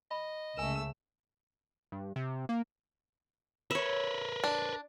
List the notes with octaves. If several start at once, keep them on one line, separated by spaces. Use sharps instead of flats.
D#5 B5
C#2 C#3 A3 A#4 G#5 E6
G2
C3
A#3
A#4 B4 C#5 E5
D4